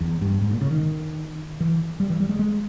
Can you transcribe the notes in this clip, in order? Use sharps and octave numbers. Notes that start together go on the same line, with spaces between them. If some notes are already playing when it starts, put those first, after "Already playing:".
E2
G2
G#2
A#2
C#3
D#3
E3
G3
E3
G3
G#3
G#3